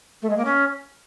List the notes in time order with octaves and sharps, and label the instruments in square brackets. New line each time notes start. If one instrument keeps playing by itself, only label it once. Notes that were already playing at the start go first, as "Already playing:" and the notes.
[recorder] A3
G#3
A#3
C#4